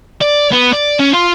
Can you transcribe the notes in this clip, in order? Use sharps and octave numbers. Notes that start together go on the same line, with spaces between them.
D5
B3
D5
C#4
F4